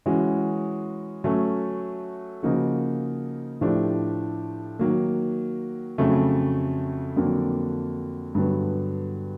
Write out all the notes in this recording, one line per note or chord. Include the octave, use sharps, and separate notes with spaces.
E3 G#3 C#4 F#4
F#3 A3 C#4
C#3 F3 A#3 D#4 F#4
A2 F3 A3 D4 G4
D#3 F#3 A#3
F2 C#3 F#3 A3
F2 D3 F#3 A#3 D4
G2 D3 F#3 B3